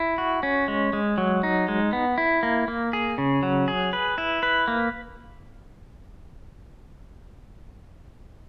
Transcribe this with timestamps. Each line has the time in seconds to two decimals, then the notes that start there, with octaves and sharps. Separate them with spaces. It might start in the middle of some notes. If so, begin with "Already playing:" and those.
Already playing: E4
0.18 F#4
0.43 C#4
0.68 G#3
0.93 G#3
1.18 F#3
1.43 D#4
1.68 G#3
1.93 B3
2.18 E4
2.43 A#3
2.68 A#3
2.93 G#4
3.18 C#3
3.43 F#3
3.68 G#4
3.93 B4
4.18 E4
4.43 B4
4.68 A#3